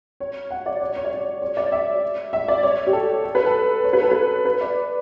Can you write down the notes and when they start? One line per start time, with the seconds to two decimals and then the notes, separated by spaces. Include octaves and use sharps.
0.20 C#5
0.51 F#5
0.66 D5
0.81 C#5
0.96 C#5
1.04 D5
1.11 C#5
1.42 C#5
1.57 D5
1.72 E5
2.33 E5
2.48 D5
2.63 C#5
2.87 G4
2.93 A4
3.24 A4
3.35 B4
3.46 A4
3.84 C#5
3.93 B4
4.03 A4
4.11 B4
4.45 B4
4.61 D5